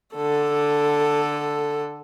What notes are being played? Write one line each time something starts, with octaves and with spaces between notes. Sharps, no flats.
D3 A4